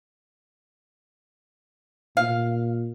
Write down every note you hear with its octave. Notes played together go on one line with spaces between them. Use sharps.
A#2 F5